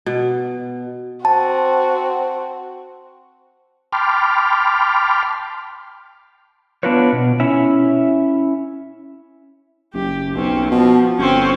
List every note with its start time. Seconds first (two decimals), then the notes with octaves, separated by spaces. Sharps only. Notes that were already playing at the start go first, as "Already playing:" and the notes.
0.06 B2
1.25 C4 F#4 A5
3.92 G5 A5 B5 C6 D6 F6
6.83 B3 D4 F4 F#4 B4 C#5
7.13 B2
7.40 C#4 E4 C#5 E5
9.94 F#1 G4
10.35 B1 C4 C#4
10.71 B2 F3
11.19 G1 C4 C#4